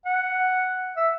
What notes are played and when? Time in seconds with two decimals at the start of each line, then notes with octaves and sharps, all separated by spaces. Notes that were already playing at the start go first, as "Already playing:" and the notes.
0.05 F#5
0.97 E5